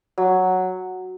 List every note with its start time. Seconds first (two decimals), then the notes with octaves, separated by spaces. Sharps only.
0.18 F#3